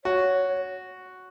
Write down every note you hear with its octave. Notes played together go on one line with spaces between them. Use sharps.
F#4 C#5